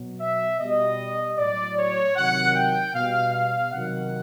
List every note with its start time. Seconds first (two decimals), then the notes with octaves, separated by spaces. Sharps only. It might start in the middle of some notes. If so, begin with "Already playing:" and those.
Already playing: B2 F#3
0.21 E5
0.60 B2 G3 D#5
1.38 A2 F#3 D5
1.78 C#5
2.16 C3 D#3 F#3 F#5
2.56 G5
2.95 B2 G3 F5
3.34 F5
3.73 C3 D#3 F#3 F#5